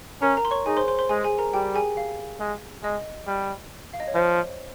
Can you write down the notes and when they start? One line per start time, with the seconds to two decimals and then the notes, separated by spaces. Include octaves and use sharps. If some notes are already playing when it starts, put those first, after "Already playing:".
0.22 C#4 A#4 A#5
0.37 A#4 A#5
0.45 C6
0.51 C#5 C#6
0.66 D#4 G#4 G#5
0.77 C5 C6
0.88 C5 C6
0.99 C5 C6
1.09 G#3 G#4 G#5
1.24 G#4 G#5
1.38 A#4 A#5
1.53 G3 G4 G5
1.75 G#4 G#5
1.97 F5
2.40 G#3
2.83 G#3 D#5
3.27 G3
3.93 F5
4.00 D#5
4.07 C#5
4.14 F3 C5